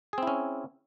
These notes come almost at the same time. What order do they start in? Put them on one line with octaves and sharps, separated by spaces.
G#4 C4 E4 C#4